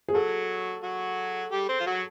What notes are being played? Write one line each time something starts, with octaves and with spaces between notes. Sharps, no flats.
G#4
F#3 F#4 A4
F#3 F#4
G3 G4
C4 C5
F4
F#3 F#4